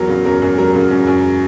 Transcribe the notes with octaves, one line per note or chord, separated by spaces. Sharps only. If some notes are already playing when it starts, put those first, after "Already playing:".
Already playing: E2 F#3 A#4
C#3
F#2 A#4
F#2
F#3 A#4
C#3
F#2
F#2